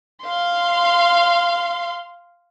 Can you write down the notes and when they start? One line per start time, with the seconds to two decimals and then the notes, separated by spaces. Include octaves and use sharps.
0.24 F5 C6